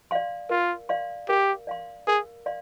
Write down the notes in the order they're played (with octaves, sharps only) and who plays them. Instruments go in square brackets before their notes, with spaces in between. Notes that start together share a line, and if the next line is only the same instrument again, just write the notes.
[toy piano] D5 F5 C6
[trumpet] F4 [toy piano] A#4
[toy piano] D5 F5 C6
[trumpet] G4 [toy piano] A#4
[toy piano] D5 F5 C6
[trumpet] G#4 [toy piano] A#4
[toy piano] D5 F5 C6